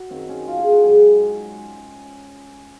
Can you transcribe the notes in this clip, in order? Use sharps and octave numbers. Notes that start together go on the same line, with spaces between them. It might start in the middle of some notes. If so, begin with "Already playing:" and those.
Already playing: F#4
F#2 D#3 F#3 C4
C#4
F4
G#4
F#4
G#2 F#3 G#4